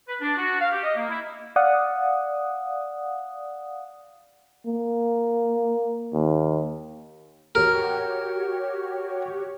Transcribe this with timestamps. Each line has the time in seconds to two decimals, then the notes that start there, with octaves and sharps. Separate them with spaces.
0.07 B4
0.21 D4
0.37 F#4
0.60 F5
0.71 G4
0.83 D#5
0.96 A#3
1.09 E4
1.56 D5 F5 F#5 D#6
4.66 A#3
6.13 D#2
7.55 F#4 G4 A#4 C#5